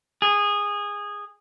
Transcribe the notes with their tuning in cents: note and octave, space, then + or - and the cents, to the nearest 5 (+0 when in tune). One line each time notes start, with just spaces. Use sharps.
G#4 -15